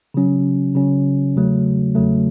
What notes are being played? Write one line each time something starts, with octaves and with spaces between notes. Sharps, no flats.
C#3 F#3 C#4
C#3 F#3 C#4
E2 C#3 F#3 A3
E2 C#3 F#3 A3